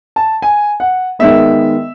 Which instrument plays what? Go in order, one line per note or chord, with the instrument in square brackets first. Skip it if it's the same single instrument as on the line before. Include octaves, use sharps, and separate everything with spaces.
[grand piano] A5
G#5
F#5
D#3 G#3 B3 E5